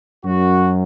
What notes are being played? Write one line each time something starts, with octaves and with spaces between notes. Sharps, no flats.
F#2 F#3 F#4